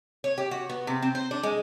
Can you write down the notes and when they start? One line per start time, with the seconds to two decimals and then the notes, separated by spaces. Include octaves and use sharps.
0.24 C#5
0.38 G4
0.51 F#4
0.70 B3
0.87 C3
1.02 C4
1.15 C5
1.31 D4
1.43 G#3